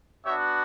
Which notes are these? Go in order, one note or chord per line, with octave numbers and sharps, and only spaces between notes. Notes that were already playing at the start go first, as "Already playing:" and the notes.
B3 D4 F#4 C#5 E5